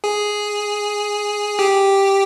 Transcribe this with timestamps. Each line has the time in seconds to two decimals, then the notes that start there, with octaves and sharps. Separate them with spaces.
0.04 G#4
1.59 G4